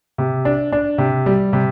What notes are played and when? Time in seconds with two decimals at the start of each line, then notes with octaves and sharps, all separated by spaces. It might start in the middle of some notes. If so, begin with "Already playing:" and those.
0.18 C3
0.45 D4
0.72 D4
0.98 C3
1.26 G3
1.53 C3